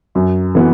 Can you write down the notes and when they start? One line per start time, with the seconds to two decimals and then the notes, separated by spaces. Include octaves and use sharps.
0.15 F#2
0.55 E3 B3 F#4